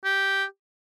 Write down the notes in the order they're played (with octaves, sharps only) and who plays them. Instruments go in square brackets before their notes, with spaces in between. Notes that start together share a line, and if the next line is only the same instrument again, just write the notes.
[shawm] G4